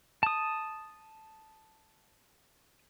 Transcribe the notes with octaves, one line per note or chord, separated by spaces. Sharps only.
A5 D#6